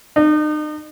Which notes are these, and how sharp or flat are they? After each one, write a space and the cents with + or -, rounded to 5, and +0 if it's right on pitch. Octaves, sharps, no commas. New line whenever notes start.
D#4 -40